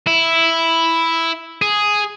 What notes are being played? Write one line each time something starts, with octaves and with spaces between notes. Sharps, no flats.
E4
G#4